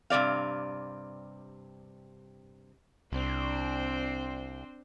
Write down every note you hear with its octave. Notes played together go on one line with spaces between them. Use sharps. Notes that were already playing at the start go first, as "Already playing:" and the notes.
G2 C3 D5 F5
C2 C4 D4 C5